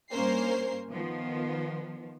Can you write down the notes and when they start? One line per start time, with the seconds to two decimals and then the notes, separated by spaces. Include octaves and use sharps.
0.12 G2 A#3 C#4 A#4 C5 C7
0.91 D#3 F3 B3